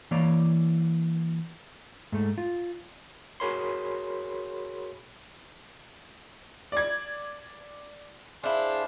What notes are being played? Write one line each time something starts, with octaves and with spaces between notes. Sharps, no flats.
E3 A#3 C#5 D5
G#2 A3
F4
F#4 G#4 A#4 C#5 B5 C6
D5 G#6
D4 E4 G#4 C5 F5